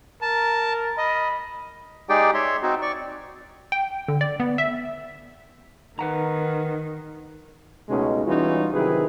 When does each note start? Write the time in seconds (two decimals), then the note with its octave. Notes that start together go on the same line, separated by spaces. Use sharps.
0.22 A#4 A5
0.98 D#5 B5
2.09 G#3 D#4 G4 G#4 D5 G5
2.34 C#5 E5 C6
2.62 C4 D#4 F#4
2.82 D5 C#6
3.72 G5
4.08 D3
4.21 D5
4.40 B3
4.58 E5
5.99 D#3 B4 F#5 A#5
7.89 C#2 B2 G#3 A3 C#4 D#4
8.26 E3 G3 C#4 D#4 F4 F#4
8.74 C3 D#3 F#3 E4 G#4 B4